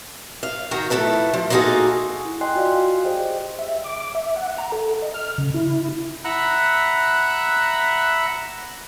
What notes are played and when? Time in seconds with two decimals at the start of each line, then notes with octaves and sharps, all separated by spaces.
0.43 F5
0.71 D#3 F#4 A#4 G5
0.90 F3 A3 E4 A4 B4
1.34 F3
1.50 A#3 D#4 F4 F#4 G#4 A4
2.25 E4
2.41 D#5 G5 G#5 C6 F#6 C7
2.54 F4 F#4 D5 F5
3.04 G4 G#4 C5 D#5 G5
3.59 E5
3.84 D6
4.15 E5
4.36 F#5
4.58 A#5
4.72 A4
5.02 D#5
5.14 F6
5.38 C#3
5.54 E4
6.25 E5 F#5 A#5 B5 E6 F#6